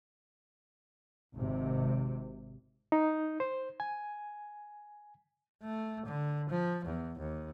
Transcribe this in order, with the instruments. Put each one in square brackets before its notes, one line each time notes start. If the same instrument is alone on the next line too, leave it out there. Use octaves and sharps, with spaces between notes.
[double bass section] G#1 C3
[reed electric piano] D#4
C5
G#5
[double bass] A3
D3
F3
E2
D#2